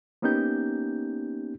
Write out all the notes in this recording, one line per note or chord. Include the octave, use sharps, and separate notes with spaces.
A#3 B3 C#4 D#4 G4 G6